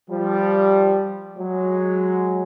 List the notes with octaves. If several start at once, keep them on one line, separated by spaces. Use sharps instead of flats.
F3 G3
F#3 G#3